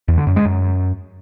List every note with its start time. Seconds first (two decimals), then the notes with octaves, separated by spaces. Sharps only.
0.08 E2
0.18 D3
0.27 F#2
0.36 G#3
0.46 F#2